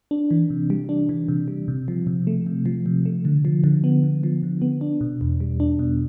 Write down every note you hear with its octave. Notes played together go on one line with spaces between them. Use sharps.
D4
E3
C3
G3
D4
E3
C3
G3
C3
F3
C3
A3
C3
F3
C3
A3
D3
F3
D3
B3
D3
F3
D3
B3
D4
B2
E2
G3
D4
B2